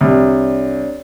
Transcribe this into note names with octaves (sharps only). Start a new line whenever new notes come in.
C2 D4 C#5 D5